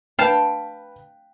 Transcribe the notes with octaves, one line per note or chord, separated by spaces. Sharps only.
B4 F5 G5 A5